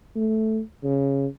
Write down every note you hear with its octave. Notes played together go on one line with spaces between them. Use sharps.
A3
C#3